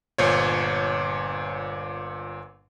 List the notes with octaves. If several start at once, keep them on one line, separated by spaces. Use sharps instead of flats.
G1 A#2 C5 C#5